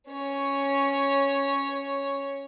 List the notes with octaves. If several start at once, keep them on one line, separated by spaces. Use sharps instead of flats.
C#4 C#5